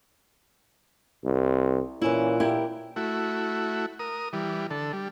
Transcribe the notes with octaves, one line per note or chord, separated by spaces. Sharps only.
C2
A#2 E3 C#4 E4
E4 G4 A#4
A3 E4 F#4
A#4 D#6
E3 G3
D3 A4
G3